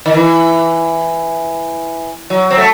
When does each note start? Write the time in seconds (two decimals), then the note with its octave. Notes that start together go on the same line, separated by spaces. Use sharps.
0.06 D#3
0.14 E3
2.30 F#3
2.50 C4
2.58 A3